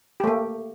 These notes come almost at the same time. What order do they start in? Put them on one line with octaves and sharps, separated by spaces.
G4 A3 A#3